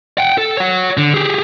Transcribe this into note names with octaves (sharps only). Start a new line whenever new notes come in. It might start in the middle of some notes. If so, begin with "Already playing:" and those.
F#5 G5
A4
C#5 F#5
D3
G4 G#4